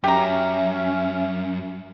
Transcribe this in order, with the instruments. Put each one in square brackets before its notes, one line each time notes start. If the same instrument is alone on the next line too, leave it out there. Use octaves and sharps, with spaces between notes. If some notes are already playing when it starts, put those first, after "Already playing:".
[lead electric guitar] F#2 [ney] C#4 [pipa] G4 A#5 [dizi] E5